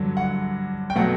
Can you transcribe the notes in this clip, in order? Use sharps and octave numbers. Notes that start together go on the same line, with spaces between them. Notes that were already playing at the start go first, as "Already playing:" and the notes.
Already playing: G2 D3 F#3
F#5
G5
B2 F#3 A3 F#5